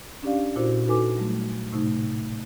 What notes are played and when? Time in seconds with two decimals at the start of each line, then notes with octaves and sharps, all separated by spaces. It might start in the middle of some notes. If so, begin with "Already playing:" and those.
0.22 C#4 D4 G4 D5 F5
0.56 A#2 E4 F#4 C5
0.86 D#4 F#4 A4 B4 G#5 D6
1.16 F#3 G3 A3
1.72 A2 C3 A3 D#4